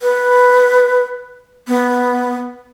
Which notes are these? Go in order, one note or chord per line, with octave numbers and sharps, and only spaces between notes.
B4
B3